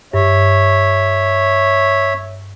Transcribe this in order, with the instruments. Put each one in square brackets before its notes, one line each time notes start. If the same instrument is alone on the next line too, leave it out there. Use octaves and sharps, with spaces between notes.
[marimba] G2 [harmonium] C#5 E5